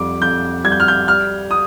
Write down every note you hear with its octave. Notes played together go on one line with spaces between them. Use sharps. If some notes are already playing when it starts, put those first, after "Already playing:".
Already playing: F2 G3 D6
F2 G6
G3 G#6
G6
F6
G6
G3 F6
D#6